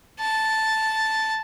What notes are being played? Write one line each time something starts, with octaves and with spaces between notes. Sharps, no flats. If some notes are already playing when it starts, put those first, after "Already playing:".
A5